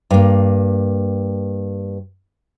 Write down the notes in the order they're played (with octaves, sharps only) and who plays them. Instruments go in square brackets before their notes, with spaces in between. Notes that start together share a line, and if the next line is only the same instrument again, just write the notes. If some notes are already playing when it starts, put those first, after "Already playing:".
[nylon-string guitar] G2 A#3